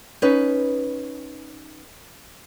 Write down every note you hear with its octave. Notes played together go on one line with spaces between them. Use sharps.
C#4 D#4 B4